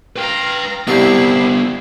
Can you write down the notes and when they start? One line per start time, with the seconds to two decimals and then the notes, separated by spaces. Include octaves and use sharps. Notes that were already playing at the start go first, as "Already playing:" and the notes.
0.16 B4 F5 G5 A#5
0.87 C2 G3 B3 C4 E4 C7